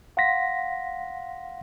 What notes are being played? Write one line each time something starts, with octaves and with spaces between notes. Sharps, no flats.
F5 F#5 C6 A#6 B6